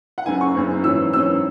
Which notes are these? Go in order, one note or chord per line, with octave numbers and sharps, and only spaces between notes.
F#5
F#1 F#2 C#3 G#5
C#6
F#1 F#2 C#3
G#1 F#2 E3 C#4 E6
G#1 F#2 E3 C#4 E6